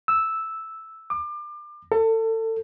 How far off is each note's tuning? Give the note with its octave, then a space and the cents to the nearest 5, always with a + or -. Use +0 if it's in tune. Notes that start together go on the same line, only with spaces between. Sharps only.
E6 -5
D6 +30
A4 +30